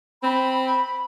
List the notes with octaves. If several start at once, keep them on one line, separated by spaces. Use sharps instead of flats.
C4 B5